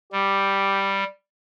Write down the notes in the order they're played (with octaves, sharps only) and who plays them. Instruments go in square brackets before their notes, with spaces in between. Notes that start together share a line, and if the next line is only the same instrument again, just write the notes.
[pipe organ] G3 [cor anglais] G4